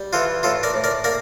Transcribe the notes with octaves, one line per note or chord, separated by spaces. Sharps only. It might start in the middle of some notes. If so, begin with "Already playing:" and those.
Already playing: G3
E3 F4 A4
A2 F4 A4
A#4 D5
A2
A#4 D5
A#3 A#4 D5